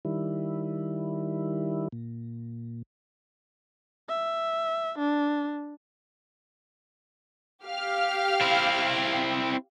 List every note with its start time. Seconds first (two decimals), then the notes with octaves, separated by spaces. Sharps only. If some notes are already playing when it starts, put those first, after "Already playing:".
0.05 D#3 G3 E4
1.92 A#2
4.09 E5
4.99 D4
7.64 G4 F5 F6
8.41 C4 E4